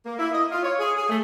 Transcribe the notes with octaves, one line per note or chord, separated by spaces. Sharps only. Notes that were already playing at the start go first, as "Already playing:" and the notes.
A#3
E4
D#5
F4
C#5
G#4
G#4
A3